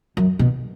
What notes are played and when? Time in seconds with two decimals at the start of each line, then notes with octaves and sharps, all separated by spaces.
0.17 F#2
0.39 B2